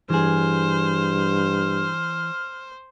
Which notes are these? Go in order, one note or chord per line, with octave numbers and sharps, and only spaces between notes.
G2 E3 G#4 C5 F6